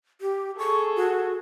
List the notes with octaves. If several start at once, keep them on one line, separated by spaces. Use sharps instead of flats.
G4
G#4 A4 C#6
F#4